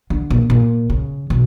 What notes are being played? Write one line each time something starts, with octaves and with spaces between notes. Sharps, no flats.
D3
A#2
A#2
C#3
B2